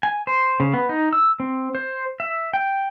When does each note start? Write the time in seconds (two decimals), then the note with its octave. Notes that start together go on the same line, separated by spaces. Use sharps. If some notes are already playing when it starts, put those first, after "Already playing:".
0.03 G#5
0.27 C5
0.60 C#3
0.74 B3
0.89 D#4
1.13 E6
1.40 C4
1.75 C5
2.20 E5
2.53 G5